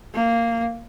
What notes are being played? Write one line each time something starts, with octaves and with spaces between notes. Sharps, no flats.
A#3